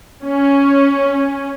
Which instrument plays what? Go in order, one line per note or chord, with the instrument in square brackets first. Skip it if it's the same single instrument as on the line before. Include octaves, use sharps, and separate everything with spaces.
[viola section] C#4